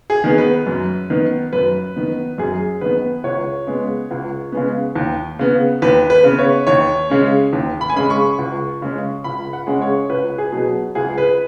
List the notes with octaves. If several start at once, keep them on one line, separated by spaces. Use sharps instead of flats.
G#4
D#3 B3
B4
F#2
D#3 B3
F#2 B4
D#3 B3
F#2 G#4
D#3 B3 B4
C#2 C#5
C#3 G#3 B3
C#2
C#3 G#3 B3
D#2
C#3 B3
D#2 B4
B4
C#3 B3
C#5
D#2 C#5
C#3 G#3 C#4
D#2
B5
G#5
C#3 G#3 C#4 B5
C#6
C#2
C#3 G#3 C#4
C#2 B5
F#5
C#3 G#3 C#4
C#5
C#2 B4
G#4
B2 F#3
C#2 G#4
B4